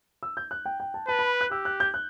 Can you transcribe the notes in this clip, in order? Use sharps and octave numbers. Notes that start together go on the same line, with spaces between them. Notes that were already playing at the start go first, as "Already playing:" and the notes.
E6
G6
F#6
G5
G5
A5
B4 A5
B5
F#6
G4 E6
F#6
G6
F#6